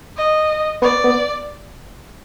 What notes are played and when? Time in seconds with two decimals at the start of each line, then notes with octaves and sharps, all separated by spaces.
0.17 D#5
0.82 B3 D5
1.04 B3